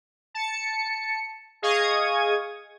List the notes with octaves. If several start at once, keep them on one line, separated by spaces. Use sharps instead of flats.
A5 C#7
G#4 D#5 F5 C#6 D#6 G#6